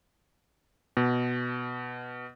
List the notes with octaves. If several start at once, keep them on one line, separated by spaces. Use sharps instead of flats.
B2